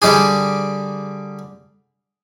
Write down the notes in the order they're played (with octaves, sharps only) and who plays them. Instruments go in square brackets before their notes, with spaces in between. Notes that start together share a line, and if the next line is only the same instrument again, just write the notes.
[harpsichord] D3 G3 G4 G#4